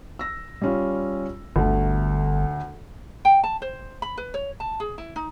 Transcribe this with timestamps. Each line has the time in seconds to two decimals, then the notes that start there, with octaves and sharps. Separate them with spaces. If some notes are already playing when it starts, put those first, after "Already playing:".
0.19 E6 A#6
0.62 G3 C#4 F4
1.56 G1 D2 A3
3.25 G5
3.44 A5
3.62 C5
4.02 B5
4.17 B4
4.34 C#5
4.60 A5
4.80 G#4
4.98 E4
5.16 D#4